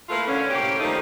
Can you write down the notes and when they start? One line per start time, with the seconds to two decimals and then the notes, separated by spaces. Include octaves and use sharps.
0.09 A3 A#3 E4 F4 B4 F5
0.28 D3 C#4
0.50 A2 C3 A#3 C#4 G4
0.80 D#3 F3 G3 A3 A#3 D#4